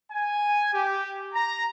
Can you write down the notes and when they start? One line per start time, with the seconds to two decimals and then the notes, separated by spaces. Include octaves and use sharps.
0.12 G#5
0.73 G4
1.34 A#5